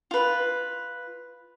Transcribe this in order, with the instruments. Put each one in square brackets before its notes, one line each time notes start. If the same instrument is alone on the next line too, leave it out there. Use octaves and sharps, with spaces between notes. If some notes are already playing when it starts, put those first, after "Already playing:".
[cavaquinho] F4 B4